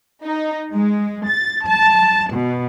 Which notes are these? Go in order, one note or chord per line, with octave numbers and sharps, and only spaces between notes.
D#4
G#3
A6
A5
B2